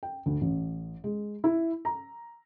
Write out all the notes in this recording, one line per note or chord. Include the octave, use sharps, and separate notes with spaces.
G5
D2
A1
G#3
E4
A#5